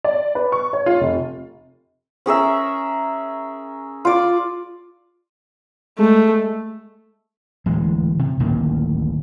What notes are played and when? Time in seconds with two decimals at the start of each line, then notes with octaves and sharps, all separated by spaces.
0.04 D5
0.35 B4
0.52 C#6
0.73 C#5
0.86 F4
1.00 F1
2.26 C#4 G#4 A#4 E5
4.05 F4 D5
5.99 G#3 A3
7.66 D1 E3 G#3
8.19 C3
8.40 D1 A1 D#3 A#3